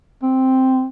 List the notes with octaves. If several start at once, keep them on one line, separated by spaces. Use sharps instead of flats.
C4